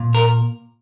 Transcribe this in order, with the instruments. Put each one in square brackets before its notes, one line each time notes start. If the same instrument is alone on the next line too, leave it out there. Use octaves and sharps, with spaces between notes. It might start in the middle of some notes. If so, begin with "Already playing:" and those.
Already playing: [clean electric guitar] A#2
A#4